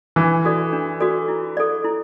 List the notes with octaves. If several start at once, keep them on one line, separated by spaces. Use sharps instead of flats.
E3 D4
F#4 A4 D5
D4
F#4 A4 D5
E4
A4 D5
E4